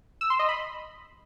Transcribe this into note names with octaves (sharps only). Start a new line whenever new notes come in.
E6
C6
D#5
B5